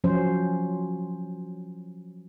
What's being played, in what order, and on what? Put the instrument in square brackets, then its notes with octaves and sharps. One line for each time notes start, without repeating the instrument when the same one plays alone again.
[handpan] F3 F#3 C#4 C5